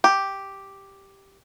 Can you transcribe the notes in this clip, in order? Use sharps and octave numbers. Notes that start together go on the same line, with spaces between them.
G4